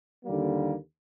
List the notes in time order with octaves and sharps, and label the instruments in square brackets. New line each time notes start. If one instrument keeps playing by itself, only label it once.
[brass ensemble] D#2 D3 G3 A#3